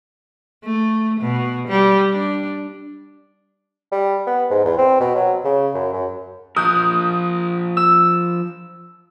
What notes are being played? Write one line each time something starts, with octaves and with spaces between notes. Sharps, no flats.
A3
B2
G3
D4
G3
B3
G#2
E2
C4
B2
F#3
C#3
F#2
F#2
F3 A#4 D#6 F#6 G6
E6